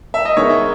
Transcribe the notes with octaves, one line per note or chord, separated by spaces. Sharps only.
E5
D#5
G#3 B3 D#4 A#4 C#5